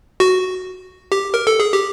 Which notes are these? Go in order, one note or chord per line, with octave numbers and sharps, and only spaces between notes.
F#4
G4
A#4
A4
G#4
G4